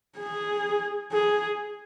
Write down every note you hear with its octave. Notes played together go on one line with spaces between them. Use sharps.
G#4
G#4